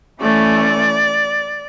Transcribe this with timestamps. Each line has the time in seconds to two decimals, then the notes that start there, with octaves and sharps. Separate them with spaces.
0.21 E3 A3 C#4 D5